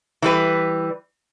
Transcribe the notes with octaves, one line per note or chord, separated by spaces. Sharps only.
E3 G3 B4